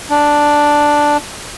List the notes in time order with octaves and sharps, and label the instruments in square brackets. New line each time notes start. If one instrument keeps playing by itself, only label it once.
[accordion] D4